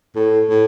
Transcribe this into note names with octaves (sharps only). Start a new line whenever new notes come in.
A2
A2